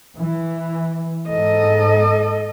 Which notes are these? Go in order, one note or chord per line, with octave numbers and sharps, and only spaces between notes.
E3
G#2 A4 D#5